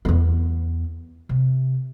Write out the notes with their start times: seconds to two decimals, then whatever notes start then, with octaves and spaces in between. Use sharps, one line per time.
0.05 E2 B3
1.29 C3